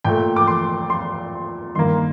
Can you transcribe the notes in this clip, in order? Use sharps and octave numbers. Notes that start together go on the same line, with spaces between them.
A#2 A3 G5
D6
C6
C6
G2 D#3 A#3 C6